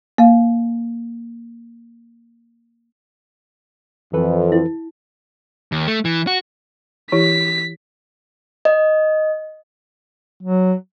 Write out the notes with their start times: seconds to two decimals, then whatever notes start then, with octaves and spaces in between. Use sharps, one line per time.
0.18 A#3 F5
4.13 F2 E3 A4 B4
4.52 E4
5.72 D#2
5.87 A3
6.05 E3
6.27 F#4
7.12 E3 E4 G4 B6
8.65 D#5
10.43 F#3